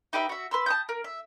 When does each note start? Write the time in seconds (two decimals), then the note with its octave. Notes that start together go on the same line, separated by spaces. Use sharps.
0.13 D#4 G4 B4 E5
0.29 F#4 E5
0.51 B4 C6 E6
0.66 A5 D#6 G6
0.89 A#4
1.04 E5